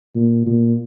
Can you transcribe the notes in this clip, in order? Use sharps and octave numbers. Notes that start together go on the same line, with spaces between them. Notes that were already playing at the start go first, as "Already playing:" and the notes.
A#2
A#2